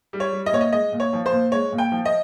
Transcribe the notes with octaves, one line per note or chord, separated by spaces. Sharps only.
G3
C#5
G3
D#5
A#2 C#5
D#5
G#3 D#5
A#2
C#5
F3
C5
A#2
G#3 C#5
A#2
G5
F3
D#5